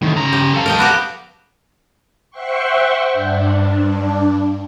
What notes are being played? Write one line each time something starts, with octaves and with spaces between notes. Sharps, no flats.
A2 D#3
C#3 A#5
G4
A4 F5
A#4 D#5 G5
B3 F#4 G4
C5 E5 F#5 G5 C6 C#6
G2 D4